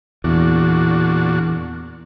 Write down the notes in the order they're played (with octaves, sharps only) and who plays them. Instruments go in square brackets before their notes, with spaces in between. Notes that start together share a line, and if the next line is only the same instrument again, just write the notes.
[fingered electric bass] E2 [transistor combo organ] A#2 D4 F#4